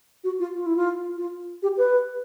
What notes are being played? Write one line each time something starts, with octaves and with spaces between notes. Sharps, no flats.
F#4
F4
F4
E4
F4
F4
G4
B4